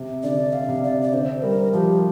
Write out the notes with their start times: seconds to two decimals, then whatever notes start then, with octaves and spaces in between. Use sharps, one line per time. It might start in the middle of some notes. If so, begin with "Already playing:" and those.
Already playing: C3
0.23 D3 D5
0.53 F5
0.68 C3
0.84 D5
1.02 D5
1.13 D3 C5
1.42 G3 A#4
1.73 F3 G4